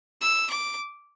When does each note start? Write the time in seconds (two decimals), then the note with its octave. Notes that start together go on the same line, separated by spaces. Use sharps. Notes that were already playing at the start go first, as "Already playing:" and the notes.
0.21 E6
0.50 D6